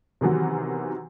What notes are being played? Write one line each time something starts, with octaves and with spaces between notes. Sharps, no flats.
C3 D#3 E3 F#3 B3